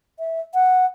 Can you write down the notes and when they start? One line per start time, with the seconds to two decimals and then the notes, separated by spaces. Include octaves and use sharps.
0.19 E5
0.54 F#5